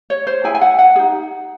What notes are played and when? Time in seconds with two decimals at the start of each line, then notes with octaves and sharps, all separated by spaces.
0.10 C#5
0.27 C5
0.44 E4 G#4 G#5
0.55 G#5
0.61 F#5
0.79 F#5
0.96 G#4
0.99 D#4